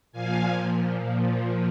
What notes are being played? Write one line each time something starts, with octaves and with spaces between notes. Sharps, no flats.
A#2 F3 F5 G#5
A#2 F3